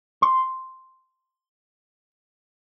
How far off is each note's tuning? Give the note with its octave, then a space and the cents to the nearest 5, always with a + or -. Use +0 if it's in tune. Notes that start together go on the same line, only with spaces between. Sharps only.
C6 +0